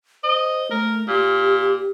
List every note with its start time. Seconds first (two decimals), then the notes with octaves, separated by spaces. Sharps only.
0.24 C5 D#5
0.71 A3 A#4
1.08 A#2 G4